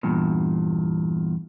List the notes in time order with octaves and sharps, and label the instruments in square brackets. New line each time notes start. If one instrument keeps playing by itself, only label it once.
[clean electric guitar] E2 G2 A#2